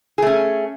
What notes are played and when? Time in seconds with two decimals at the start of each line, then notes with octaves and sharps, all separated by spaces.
0.18 G#4
0.22 A3
0.27 C#4